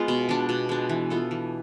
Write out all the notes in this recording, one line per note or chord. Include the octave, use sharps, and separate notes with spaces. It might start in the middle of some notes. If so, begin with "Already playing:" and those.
Already playing: G#3 B3 F4
B2
G#3 D4
B2
G#3 D4
E3
B3 F4 A4
E3